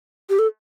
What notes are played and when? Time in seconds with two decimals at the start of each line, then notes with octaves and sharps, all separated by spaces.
0.30 G4
0.39 A4